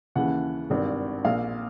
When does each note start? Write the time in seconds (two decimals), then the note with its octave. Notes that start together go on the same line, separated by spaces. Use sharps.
0.16 D#2 C#3 E3 F#5
0.70 G#1 G2 D#3
1.25 A#1 A#2 F5